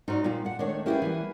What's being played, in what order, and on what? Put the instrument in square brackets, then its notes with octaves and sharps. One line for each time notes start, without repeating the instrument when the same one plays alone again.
[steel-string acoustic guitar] G#2 [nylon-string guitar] D#4 F#4 D5
[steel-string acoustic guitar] A#2 [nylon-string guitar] G3 B3 F4
[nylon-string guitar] D4 F#5
[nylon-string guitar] D#3 G#3 A3 [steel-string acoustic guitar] D4 C#5
[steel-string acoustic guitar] A#3 B3 G#4 [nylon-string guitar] C#4 E4 G4
[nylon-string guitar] E3 G3